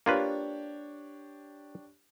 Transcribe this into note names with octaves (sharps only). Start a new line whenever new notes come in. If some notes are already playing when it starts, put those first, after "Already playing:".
A#3 D4 F4 G4 B4 C#5